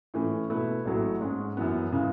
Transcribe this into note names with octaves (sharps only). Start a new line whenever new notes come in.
A2 E3 A3 C#4
B2 A3 E4 B4
A1 A2 F#3 A3
G#2 G#3 C#4
F#2 E3 B3
C#3 E3 G#3